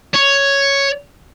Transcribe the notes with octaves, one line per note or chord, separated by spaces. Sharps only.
C#5